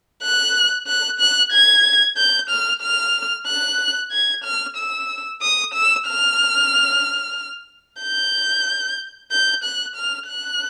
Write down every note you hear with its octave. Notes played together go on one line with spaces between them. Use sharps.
F#6
F#6
F#6
G#6
G6
F6
F6
F#6
G#6
F6
E6
D#6
E6
F6
G6
G6
F#6
F6
F#6